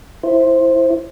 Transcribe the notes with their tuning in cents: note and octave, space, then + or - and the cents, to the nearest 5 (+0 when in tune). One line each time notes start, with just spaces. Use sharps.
E4 +0 C5 +10